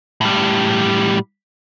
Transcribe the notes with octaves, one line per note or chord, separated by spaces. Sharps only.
A2 G3